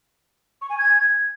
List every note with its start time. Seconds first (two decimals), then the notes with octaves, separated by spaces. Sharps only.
0.61 C#6
0.69 G#5
0.77 G#6